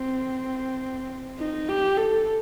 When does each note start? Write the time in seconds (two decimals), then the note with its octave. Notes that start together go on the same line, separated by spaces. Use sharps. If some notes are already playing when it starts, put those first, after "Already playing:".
Already playing: C4
1.39 D#4
1.69 G4
1.97 A4